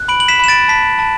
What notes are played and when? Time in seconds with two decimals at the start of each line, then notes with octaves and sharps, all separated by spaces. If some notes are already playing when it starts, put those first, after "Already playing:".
Already playing: F#6
0.08 B5 D7 F#7
0.20 F#7
0.28 B6 E7
0.39 B5 E7
0.48 A6 D7
0.69 A5 B6
0.99 A5